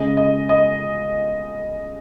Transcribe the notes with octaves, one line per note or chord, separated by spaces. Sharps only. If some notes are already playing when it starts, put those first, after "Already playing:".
Already playing: C#3 G#3 D#5
D#5
D#5